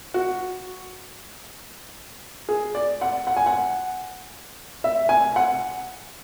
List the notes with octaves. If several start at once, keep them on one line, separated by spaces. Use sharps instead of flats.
F#4
G#4
D5
F#5
F#5
G#5
F#5
E5
G#5
F#5